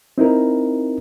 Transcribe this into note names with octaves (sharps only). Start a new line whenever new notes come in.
C4 D#4 E4 A#4